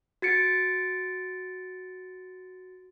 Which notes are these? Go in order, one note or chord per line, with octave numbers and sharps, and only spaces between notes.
F#4 A6 C#7 D7